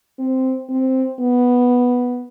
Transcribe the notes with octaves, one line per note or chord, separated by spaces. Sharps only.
C4
C4
B3